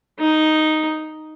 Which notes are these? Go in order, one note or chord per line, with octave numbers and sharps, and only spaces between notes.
D#4